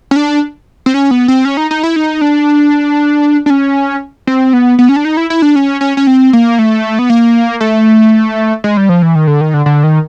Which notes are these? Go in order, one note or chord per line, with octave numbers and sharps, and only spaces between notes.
C#4
D4
C4
C#4
B3
C4
C#4
D#4
D#4
E4
D#4
D4
D4
C#4
C4
B3
B3
C#4
D4
D#4
E4
E4
D4
C#4
C#4
C#4
C4
A#3
A3
B3
A#3
A3
G#3
G3
F3
E3
D#3
D3
D#3
D3
D3
D#3